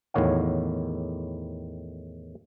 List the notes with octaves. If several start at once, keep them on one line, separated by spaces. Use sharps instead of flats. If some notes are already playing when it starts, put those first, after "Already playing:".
E2 A2 D#3 C#5 F5 F#5